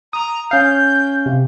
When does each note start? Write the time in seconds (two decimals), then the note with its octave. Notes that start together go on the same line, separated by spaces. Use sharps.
0.13 A#5 D#6
0.51 C#4 F5 G6
1.26 C3